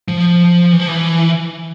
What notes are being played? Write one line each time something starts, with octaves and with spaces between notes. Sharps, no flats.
F3
E3
F3
E3